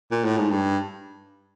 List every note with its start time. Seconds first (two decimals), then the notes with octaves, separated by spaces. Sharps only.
0.12 A#2
0.25 A2
0.38 G#2
0.51 G2